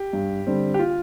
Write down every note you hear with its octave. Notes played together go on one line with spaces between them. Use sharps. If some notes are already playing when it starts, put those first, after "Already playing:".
Already playing: G4
G2
D3 G3 C4
G4
F4